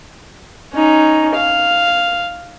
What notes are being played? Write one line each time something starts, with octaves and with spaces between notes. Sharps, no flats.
C#4 D#4
F5